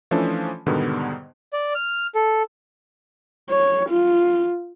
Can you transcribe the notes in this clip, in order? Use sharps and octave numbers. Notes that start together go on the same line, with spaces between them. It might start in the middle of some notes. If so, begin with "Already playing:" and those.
E3 F3 A3 C#4 D4 A4
G#2 B2 D3 D#3 G3 B3
D5
F6
A4
C#5
F4